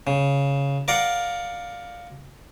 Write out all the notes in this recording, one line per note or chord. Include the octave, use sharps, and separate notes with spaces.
C#3
A#4 D5 F5 F#5